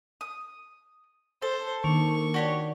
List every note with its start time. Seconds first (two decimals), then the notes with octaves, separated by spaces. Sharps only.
0.21 D#6
1.42 A4 C5
1.84 D#3 A#3 D4 C#6
2.34 F#4 G4 C#5 D5 A5